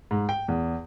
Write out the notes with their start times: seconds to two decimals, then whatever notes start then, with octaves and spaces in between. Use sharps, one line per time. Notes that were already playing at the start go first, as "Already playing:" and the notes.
0.11 G#2
0.29 G5
0.48 E2